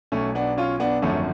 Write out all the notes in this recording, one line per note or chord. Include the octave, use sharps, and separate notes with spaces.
B1 B2 A3 C#4
B3 D4
C#4 F4
B3 D4
G#1 F#2 D3 F3 A3 C#4